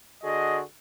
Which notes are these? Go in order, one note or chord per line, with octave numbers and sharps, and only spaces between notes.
D3 F#4 G#4 D#5